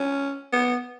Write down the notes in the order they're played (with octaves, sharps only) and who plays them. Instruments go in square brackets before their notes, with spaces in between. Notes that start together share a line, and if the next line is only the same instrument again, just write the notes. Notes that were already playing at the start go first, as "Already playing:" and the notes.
Already playing: [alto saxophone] C#4
B3